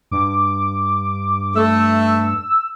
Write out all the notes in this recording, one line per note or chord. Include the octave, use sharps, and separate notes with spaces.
G2 D6
A3 E6